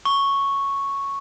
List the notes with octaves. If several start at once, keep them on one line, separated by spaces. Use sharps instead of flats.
C#6